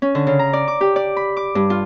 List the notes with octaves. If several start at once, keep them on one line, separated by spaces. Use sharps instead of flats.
C#4
D3
C#3
A#5
D5
D6
G4
D5
B5
D6
G2
F4